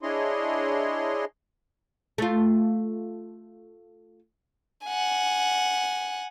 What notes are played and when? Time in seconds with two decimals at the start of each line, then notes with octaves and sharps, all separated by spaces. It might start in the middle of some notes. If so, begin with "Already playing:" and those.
0.02 D4 E4 G#4 C#5 D#5 C6
2.18 A3 F4
4.88 F#5 G#5